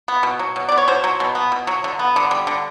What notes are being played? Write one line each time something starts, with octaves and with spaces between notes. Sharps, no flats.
B3
B2
F#3
B2
B3 D5
C#5
B2 C5
F#3
B2
B3
B2
F#3
D3
B3
D3
G3
D3